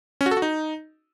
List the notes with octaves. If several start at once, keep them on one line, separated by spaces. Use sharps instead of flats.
C#4
F#4
A4
F#4
D#4